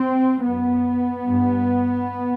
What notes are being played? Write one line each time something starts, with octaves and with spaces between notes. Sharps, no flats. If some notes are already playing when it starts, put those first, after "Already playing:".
Already playing: C4
F#2 B3
G2